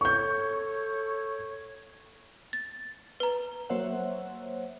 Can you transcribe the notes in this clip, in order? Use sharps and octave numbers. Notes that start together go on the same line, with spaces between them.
A4 C#5 C#6 G6
A6
B4 A#5
F#3 A#3 C5 C#5 E5 F#5